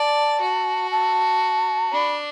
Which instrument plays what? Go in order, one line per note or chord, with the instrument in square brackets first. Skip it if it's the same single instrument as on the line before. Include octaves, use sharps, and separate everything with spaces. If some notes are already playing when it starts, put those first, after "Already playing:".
Already playing: [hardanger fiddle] D5 [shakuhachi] A5
[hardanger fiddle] F#4
[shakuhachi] A5
[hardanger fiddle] D4 [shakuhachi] B5